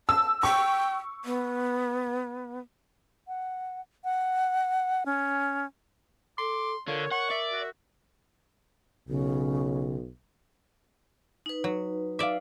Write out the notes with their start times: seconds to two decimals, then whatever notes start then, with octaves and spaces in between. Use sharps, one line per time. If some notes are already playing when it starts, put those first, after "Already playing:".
0.09 A5 E6
0.43 G5 C#6
1.25 B3
3.28 F#5
4.04 F#5
5.06 C#4
6.38 A4 C6 D6
6.87 D3 F4 A#4 C#5
7.11 C#5 F#5 C#6
7.31 D5 E5
7.53 F#4
9.09 B1 C#3
11.46 D#4 B4
11.64 F#3
12.19 D5 E5 F5 D6